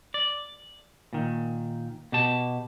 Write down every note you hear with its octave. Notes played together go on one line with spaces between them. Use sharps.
D5
A#2 D#3
B2 G4 A5